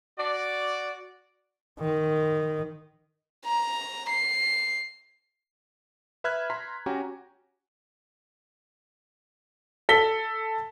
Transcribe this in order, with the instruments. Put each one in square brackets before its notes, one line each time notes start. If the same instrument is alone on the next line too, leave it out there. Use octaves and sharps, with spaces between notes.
[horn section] F#4 D5
[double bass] D#3
[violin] A#5
C7
[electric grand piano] B4 E5 B5 F6 F#6 G#6
A#5 C6 F6 B6
C#4 F#4 G4 G5 G#5 A#5
[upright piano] A4 B6 G7